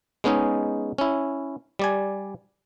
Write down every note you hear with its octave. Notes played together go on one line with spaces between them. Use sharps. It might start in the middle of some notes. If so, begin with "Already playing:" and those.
G#3 B3 C#4 D#4 G#4
C#4 E4
G3 D5 G#5